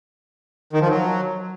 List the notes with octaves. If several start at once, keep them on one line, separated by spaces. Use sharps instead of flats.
D#3
F3
F#3